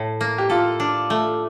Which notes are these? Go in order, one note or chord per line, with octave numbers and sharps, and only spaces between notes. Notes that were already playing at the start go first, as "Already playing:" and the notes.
Already playing: A2
A#3
G4
F4 A4
D4
A3